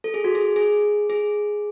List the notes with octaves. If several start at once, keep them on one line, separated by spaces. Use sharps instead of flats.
A4
G#4
F#4
G#4
G#4
G#4